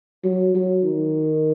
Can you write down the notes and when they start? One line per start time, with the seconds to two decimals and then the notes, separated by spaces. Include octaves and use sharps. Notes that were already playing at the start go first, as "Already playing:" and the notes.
0.24 F#3
0.55 F#3
0.84 D#3